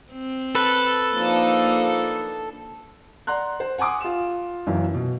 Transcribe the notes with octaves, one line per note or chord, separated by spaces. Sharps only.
C4
A4 B4
F3 A#3 D4 D#4
D5 F#5 A#5 C6 F#6
C5
F#5 G#5 C6 D6 D#6
F4 E7
F#1 F#2 E3 F5
B2